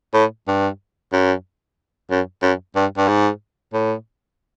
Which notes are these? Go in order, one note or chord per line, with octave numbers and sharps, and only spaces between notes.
A2
G2
F#2
F#2
F#2
G2
G2
G#2
A2